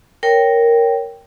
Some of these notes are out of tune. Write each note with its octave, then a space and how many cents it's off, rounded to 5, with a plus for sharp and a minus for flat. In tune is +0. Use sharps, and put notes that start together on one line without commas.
A#4 +0 C#5 +0 G5 +0